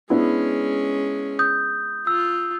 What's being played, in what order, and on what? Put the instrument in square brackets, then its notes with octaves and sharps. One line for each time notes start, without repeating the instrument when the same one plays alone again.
[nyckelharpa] G#3 C#4 [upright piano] B3 D4 E4
[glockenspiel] D#6 G6
[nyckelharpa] F4 [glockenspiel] E6